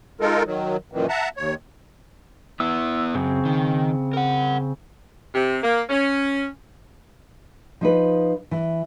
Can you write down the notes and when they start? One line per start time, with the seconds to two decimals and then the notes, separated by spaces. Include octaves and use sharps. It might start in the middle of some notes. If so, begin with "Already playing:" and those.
0.21 G#3 D#4 F4 A4 A#4
0.45 D#3 F#3
0.92 F#2 A#2 D#3 E3
1.09 E5 F#5 A5 A#5
1.37 D#2 C#5
2.60 B3 E4 E6
3.15 F#2 C#3 C4
3.45 D#3
4.13 A#4 F#5
5.34 C3
5.63 A#3
5.89 C#4
7.81 F3 D#4 B4
8.51 E3